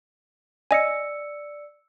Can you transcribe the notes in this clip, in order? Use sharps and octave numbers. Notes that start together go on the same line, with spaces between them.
D5 D#5 G#5 E6 C#7